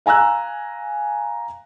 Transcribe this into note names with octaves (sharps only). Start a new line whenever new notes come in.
F5 G#5 A#5 E6 F#6